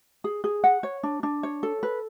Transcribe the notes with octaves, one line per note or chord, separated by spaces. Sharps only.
G#4
G#4
F#5
C#5
D4
D4
C#5
A4
B4